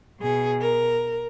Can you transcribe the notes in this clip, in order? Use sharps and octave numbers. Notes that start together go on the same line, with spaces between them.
B2 G#4
A#4